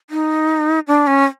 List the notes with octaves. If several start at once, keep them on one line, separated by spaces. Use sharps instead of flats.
D#4
D4
C#4